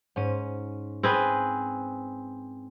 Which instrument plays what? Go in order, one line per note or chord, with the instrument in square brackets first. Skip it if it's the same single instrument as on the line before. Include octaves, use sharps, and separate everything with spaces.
[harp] G#2 C#4 D#7
[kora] C4 G#4 B4